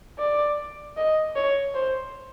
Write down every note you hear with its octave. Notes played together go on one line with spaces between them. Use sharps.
D5
D#5
C#5
C5